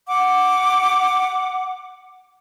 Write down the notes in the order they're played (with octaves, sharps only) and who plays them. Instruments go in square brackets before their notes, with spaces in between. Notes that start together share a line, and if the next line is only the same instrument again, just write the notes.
[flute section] F#5 D6